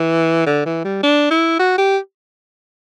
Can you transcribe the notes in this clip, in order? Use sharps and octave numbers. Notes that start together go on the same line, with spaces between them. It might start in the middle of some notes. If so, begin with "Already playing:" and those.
Already playing: E3
D3
E3
G3
D4
E4
F#4
G4